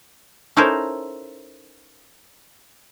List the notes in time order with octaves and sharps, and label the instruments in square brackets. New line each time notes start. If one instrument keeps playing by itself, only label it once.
[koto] C#4 D#4 E4 A4 A#4 C5